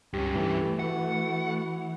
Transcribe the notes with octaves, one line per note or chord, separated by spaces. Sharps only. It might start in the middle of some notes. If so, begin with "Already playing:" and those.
C#2 G2 C#4 G4
E3 A3
F#4 F#5